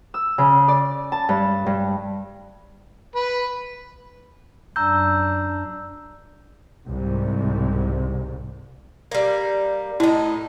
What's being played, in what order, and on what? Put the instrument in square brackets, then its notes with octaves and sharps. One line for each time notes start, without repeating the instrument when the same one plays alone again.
[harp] E6
C#3
D5
A5
G2
G2
[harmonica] B4
[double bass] F#2 D4 [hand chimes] A#5 E6 G6
[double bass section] C2 G#2
[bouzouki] G3 A#3
[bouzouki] A2 D#4 [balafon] E4